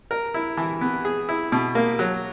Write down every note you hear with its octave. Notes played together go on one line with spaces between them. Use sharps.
A#4
E4
E3
B3
G#4
E4
B2
A#3
F#3